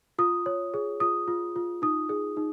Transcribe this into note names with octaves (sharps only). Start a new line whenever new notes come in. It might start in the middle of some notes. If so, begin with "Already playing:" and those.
F4 D#6
C#5
G#4
F4 D#6
F4
F4
D#4 D#6
G#4
D#4